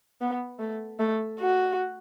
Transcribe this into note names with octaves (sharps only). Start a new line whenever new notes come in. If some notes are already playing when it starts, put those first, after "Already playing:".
B3
A3
A3
F#4